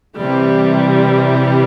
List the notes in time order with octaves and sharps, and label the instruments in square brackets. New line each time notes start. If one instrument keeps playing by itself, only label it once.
[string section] C3 E3 G3